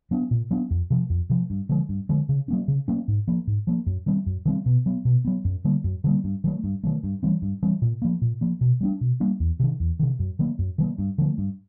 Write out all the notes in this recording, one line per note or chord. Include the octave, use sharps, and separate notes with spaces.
F#3 B3 D4
A#2
F#3 B3 D4
F2
C3 F3
F2
C3 F3
G2
D3 F3 G#3
G2
D3 F3 G#3
C#3
F#3 A#3 C#4
C#3
F#3 A#3 C#4
G#2
F3 A#3
G#2
F3 A#3
F#2
D#3 G3 C4
F#2
D#3 G3 C4
B2
F#3 B3
B2
F#3 B3
F#2
D3 G3 A#3
F#2
D3 G3 A#3
G2
D#3 F#3 A3
G2
D#3 F#3 A3
G2
E3 G3 C4
G2
E3 G3 C4
A#2
F3 A#3
A#2
F3 A#3
B2
G3 A#3 D4
B2
G3 A#3 D4
E2
C3 D#3
E2
C3 D#3
F#2
D#3 F#3 A#3
F#2
D#3 F#3 A#3
G2
D3 F3 A3
G2